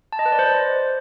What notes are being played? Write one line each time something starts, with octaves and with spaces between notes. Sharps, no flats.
A5
D#5
B4
D5
C5